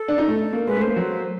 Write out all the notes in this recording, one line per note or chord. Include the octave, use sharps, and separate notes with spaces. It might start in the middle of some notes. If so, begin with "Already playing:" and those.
Already playing: A4
D4
D#4
A3
A#3
G#3 B4
A3
A#3 C5
F#3